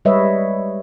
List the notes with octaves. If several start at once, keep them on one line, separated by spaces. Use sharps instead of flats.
G3 G#3 B4 C#5 D#5 E5